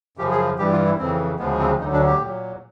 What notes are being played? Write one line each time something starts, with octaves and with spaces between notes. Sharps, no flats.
F#2 C#3 F3 G4
G#4
G2 E3 G3 G4
F4
E4
F2 C#3 E3 C4
D2 C#3 F3 G#3 B3
C4
D2 D3 F#3 D#4
D4
G4
A#2 F#3